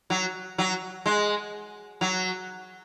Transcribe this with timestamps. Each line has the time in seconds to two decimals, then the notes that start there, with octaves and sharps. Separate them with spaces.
0.10 F#3
0.58 F#3
1.06 G#3
2.01 F#3